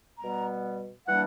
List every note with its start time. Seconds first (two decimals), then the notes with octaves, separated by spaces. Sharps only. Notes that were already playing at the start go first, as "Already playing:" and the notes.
0.19 B2 G3 B3 A#5
1.07 E3 G3 A#3 D4 F#5